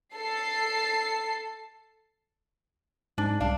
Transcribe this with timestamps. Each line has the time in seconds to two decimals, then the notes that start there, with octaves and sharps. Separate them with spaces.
0.15 A4 C7
3.18 G#2 D4
3.40 C2 D4 F5